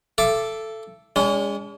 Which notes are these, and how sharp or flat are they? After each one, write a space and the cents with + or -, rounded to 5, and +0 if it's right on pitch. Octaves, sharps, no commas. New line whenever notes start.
A4 +0 E5 +40 D6 +0
G#3 -25 C#4 +45